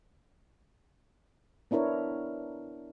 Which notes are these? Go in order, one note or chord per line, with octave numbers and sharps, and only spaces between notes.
B3 D4 E4 A#4 C#5